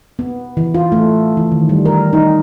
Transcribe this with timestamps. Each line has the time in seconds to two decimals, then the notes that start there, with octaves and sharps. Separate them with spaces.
0.19 B3
0.57 E3
0.74 F4
0.92 A3
1.37 E3
1.52 D#3
1.69 G3
1.85 A#4
2.13 D#4